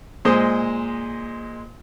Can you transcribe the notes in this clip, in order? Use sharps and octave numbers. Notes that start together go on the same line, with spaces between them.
A#2 G#3 C5 D#5